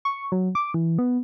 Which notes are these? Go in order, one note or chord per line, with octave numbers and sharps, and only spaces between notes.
C#6
F#3
D6
E3
B3